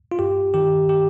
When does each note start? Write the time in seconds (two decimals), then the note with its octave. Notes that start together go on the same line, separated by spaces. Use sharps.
0.12 F4
0.19 G2 G4
0.54 D#3 G4
0.89 G4